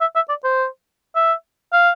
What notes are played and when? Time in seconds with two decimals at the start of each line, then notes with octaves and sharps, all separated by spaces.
0.01 E5
0.15 E5
0.29 D5
0.44 C5
1.15 E5
1.73 F5